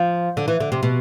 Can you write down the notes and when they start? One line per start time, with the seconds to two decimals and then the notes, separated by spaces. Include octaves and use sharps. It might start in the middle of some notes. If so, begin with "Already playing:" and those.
Already playing: F3
0.37 D3
0.48 E3
0.60 D3
0.72 C3
0.83 B2